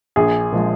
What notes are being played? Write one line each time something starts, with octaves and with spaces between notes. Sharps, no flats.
A#1 G#4
A#2 F3 G#3